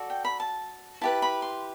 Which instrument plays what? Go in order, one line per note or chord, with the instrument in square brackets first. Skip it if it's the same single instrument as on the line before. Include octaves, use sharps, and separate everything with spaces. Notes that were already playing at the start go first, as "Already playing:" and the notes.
Already playing: [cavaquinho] F#4 A4 D5
G5
B5
A5
E4 G4 B4 A5
B5
C6